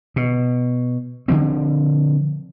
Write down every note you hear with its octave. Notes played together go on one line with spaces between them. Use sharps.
B2
D3 D#3 F3 C4